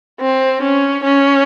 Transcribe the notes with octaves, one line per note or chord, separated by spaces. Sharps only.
C4
C#4
C#4